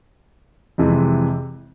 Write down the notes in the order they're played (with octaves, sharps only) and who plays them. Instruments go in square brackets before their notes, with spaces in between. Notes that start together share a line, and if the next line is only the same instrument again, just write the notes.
[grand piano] F2 C3 E3 G#3